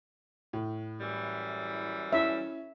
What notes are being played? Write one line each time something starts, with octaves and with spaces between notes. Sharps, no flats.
A2
F#2 E3 G3
C#4 E4 E5